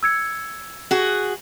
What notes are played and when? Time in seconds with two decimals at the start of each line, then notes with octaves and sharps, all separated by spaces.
0.03 E6 G#6 C#7
0.91 F#4 G#4